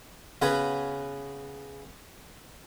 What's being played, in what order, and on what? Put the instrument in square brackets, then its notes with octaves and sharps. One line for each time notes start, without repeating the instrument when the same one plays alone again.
[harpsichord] C#3 B3 C#4 F#4 B4 C#5